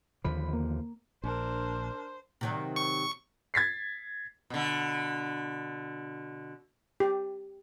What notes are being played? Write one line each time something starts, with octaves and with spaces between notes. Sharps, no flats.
D#2 D3 F3 B5
A#3
A#1 D4 A#4 C5
C3 D#3 F#3
C#6
G#6 A6 B6 C7
B2 D3
G4